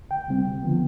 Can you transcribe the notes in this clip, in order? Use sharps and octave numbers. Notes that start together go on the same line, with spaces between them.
D2 G5
C3 G3 C4
D2
D3 F3 B3